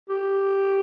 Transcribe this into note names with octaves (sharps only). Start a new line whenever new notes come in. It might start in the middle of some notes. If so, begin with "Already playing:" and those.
G4